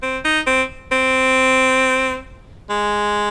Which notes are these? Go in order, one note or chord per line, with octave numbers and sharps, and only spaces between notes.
C4
D#4
C4
C4
G#3